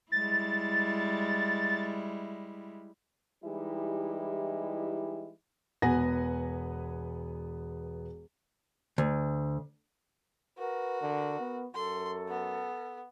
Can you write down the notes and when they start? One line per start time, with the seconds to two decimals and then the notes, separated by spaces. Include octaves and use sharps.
0.12 G3 G#3 E4 A6
3.44 E3 G3 G#3 D#4 E4 G4
5.82 E1 B3 B4 F#5 G#5 A#6
8.98 D2
10.59 F#4 A#4 B4
11.02 D3
11.40 B3
11.75 F#2 A4 C6
12.28 B3